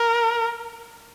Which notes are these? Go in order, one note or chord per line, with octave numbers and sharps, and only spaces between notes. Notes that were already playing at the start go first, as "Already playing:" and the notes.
Already playing: A#4